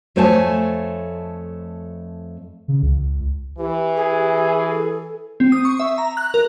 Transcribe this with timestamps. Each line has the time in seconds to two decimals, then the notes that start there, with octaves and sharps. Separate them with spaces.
0.16 F2 A3 C5 C#5 G#5 A5
2.68 C#3
2.82 C#2
3.58 E3 G4
3.96 G#4
4.70 A4
5.40 C4
5.52 D#6
5.65 C#6
5.80 E5
5.98 A#5
6.17 F#6
6.34 A#4